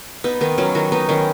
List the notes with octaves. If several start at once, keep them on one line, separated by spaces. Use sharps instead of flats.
B3 D#4
D#3 B3
F#3 C#4
D#3 F#4
B3 D#4
D#3 C#4